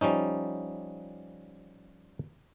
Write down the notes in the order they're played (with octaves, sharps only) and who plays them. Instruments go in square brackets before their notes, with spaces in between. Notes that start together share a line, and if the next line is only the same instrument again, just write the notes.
[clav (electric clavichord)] F3 G3 C#4 D#4